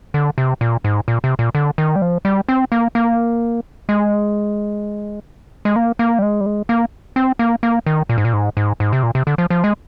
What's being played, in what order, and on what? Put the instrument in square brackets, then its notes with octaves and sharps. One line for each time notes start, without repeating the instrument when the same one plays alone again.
[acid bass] D3
C3
A#2
G#2
A#2
C3
A#2
D3
D#3
G3
F3
G3
C4
A#3
A#3
G#3
G#3
A#3
A#3
G3
G#3
G3
G#3
A#3
C4
A#3
A#3
D#3
A#2
G#2
A#2
G#2
G#2
G#2
C3
A#2
C3
D3
F3
F3
G#3